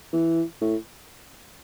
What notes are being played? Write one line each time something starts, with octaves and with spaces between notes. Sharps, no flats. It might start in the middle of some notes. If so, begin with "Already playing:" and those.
E3
A2